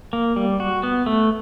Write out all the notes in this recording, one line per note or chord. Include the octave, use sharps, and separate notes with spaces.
A#3
G3
F#4
B3
A3